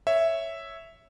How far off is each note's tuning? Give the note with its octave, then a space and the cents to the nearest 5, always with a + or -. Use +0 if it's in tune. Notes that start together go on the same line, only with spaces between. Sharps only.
C#5 +0 E5 +0